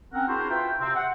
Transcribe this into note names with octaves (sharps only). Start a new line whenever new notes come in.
C4 C#4 A#4 F#5
D4 E4 F#4 G#4 A#4 C5
F4 F#4 B4 E5 F5 G5
C3 C4
F#5